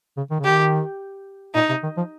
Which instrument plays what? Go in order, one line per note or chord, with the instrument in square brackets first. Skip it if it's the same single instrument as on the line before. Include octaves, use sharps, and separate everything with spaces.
[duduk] C#3
D#3
C#3
[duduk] D#3 [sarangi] G4
[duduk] A#2 [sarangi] D#4
[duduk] C3
D#3
F3